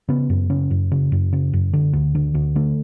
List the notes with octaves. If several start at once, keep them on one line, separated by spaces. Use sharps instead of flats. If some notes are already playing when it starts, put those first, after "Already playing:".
C#3 B3
F#2
C#3 C#4
F#2
C#3
F#2
C#3
F#2
D3
D2
D3
D2
D3 A3